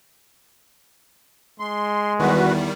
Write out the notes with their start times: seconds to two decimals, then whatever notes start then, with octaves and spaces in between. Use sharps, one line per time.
1.60 G#3 C6
2.20 E2 D#3 G3 F#4 B4